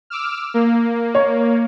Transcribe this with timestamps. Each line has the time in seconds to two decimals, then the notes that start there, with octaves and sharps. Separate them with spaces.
0.10 D6 E6 F6
0.54 A#3
1.15 C#5